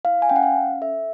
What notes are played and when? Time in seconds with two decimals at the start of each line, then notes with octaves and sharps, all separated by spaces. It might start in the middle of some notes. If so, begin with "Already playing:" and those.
0.05 E4 F5
0.22 G#5
0.29 C#4 G5
0.36 F#5
0.43 F5
0.56 C#4
0.81 A4 E5